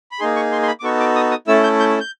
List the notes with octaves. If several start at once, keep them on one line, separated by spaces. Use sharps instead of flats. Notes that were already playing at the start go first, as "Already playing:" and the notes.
B5
A#3 D#4 G#4 C6
C#6
C6
C6
B5
D6
B3 D#4 F#4 A4 C#6
D6
D#6
D#6
A3 C#4 E4 A4 E6
G6
G6
G6